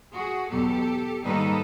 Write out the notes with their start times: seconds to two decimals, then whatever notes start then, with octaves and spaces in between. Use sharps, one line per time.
0.15 F#4 G#4
0.51 E2 B2 F#3 G4 A4
1.24 G#2 D#3 G3 A#3 D#4 A4 B4